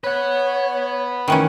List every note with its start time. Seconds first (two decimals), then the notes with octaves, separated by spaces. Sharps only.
0.04 B4 C#5 F#5
1.28 D#3 E3 C#4